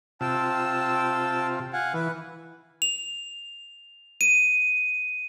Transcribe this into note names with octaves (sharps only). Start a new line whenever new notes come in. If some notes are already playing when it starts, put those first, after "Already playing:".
C3 F4 G5 A5 E6
F5 F#5 G#5
E3 B4
F7
D#7